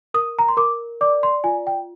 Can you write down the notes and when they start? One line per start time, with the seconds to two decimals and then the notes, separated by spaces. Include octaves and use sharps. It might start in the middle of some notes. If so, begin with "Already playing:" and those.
0.14 A#4 D#6
0.39 A#5
0.48 C6
0.57 A#4 D6
1.01 D5 D6
1.23 C6
1.44 F4 G#5
1.67 G5